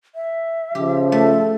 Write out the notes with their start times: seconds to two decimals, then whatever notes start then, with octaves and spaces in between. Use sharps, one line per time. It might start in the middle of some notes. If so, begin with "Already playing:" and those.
0.15 E5
0.75 C#3 F3 G4
1.12 A3 A4